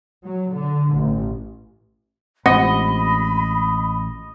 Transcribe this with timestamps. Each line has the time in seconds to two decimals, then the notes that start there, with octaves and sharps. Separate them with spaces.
0.25 F#3
0.54 D3
0.96 A1
2.46 A1 G#3 C4 D#5 F#5 B5